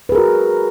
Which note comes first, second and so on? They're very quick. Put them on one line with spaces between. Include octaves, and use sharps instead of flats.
B4 G#4 A#4 F#4